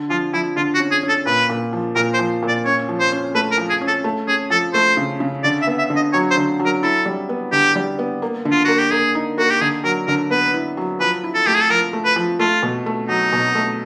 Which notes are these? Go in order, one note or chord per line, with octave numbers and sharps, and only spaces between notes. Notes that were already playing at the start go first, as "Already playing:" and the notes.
Already playing: D3
F3 F4
F3 E4
D3 F4
F#4
C#4
G#4
C#4
A4
A#2 B4
A#2
F3
A#2 A#4
C5
F3
A#2
D5
C#4 C#5
F3
C5
C#4
A3 B4
A#4
F3
G#4
C#4
A4
A3
C#4 G#4
F3 A4
A3 C5
C#3
C#3
D3 D5
E5
B3
E5
D3
D#5
F#3 C#5
C5
D3
F#3
A#4
E4 A4
G3
B3
D3 G4
G3
B3
A#3
D3
F4
A#3 F#4
G4
A#3 G#4
D#4
A#3 F#4
G4
D3 G#4
F#3 A#4
D3 A#4
B3 B4
E4
F#3
F3 B4
E4
A4
A3 G4
G#4
A4
F3 A#4
A3
B4
F3
A3 F4
B2
A3
F#3 D#4
B2
A3